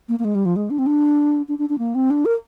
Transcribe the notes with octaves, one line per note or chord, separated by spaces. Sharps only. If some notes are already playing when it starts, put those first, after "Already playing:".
A#3
A#3
G#3
G3
F3
G#3
D4
C4
D4
D4
D4
D4
A#3
C4
D4
A#4